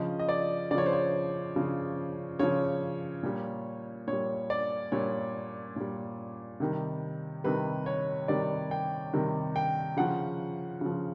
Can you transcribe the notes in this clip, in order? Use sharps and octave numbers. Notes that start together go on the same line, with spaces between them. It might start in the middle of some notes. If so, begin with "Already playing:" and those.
Already playing: C#3 F3 D#5
D#5
D5
C#3 F3 C#5 D5
C5
C#5
C#3 F3
C#3 F3 C#5
A#2 G3
A#2 C#5
G3
D5
A#2 G3 C#5
A#2 G3
C3 D#3 G3
C3 D#3 G3 B4
C#5
C3 D#3 G3 D5
G5
C3 D#3 G3
G5
C#3 F3 F#5
C#3 F3